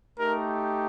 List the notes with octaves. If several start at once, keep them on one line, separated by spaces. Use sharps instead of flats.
A3 D#4 G4 A#4